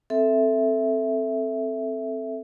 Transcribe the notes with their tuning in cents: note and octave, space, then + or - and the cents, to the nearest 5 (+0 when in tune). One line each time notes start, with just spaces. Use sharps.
C4 +0 A4 +0 E5 +0